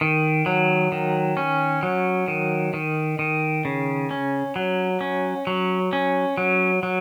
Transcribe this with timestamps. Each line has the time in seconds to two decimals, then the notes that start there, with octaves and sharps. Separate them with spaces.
0.01 D#3
0.46 F#3
0.92 D#3
1.37 C#4
1.83 F#3
2.28 D#3
2.74 D#3
3.19 D#3
3.65 C#3
4.11 C#4
4.56 F#3
5.01 C#4
5.47 F#3
5.93 C#4
6.38 F#3
6.83 F#3